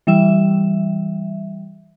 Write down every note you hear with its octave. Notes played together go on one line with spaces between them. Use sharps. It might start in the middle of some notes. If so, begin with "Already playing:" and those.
E3 G3 E5